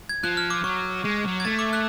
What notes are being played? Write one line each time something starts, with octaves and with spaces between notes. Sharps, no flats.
G#6
F3 F#6
F6
D6
F#3 C#6
G#3
F#3
G#6
A3 A6
D6
F#6